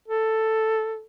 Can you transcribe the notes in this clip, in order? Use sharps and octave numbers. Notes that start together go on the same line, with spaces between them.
A4